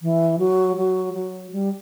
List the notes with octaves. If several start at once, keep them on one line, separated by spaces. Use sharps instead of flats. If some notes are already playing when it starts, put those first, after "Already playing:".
E3
F#3
F#3
F#3
G3